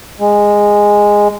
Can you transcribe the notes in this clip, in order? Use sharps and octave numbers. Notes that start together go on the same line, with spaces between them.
G#3